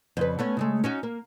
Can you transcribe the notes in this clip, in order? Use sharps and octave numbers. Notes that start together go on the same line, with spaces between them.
F2 C#3 B4
A3 B3 C#4
C#3 G#3 A3
C#4 D#4 F#4
A#3